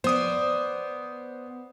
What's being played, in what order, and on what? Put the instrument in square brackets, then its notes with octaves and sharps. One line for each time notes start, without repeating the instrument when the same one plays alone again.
[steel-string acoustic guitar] B3 D5 [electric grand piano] C5 D#6